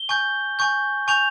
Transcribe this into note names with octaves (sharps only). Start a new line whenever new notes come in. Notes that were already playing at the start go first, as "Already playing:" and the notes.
Already playing: G7
G#5 C#6 G6
G#5 C#6 G6
G#5 C#6 G6 F7